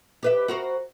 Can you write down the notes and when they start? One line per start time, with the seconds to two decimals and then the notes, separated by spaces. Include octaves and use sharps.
0.23 G4 B4 E5
0.48 F#4 A#4 C5